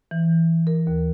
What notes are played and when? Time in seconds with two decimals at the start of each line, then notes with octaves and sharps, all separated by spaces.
0.11 E3
0.67 A#4
0.87 D#2